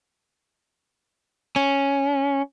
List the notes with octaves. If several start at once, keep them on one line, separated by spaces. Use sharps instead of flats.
C#4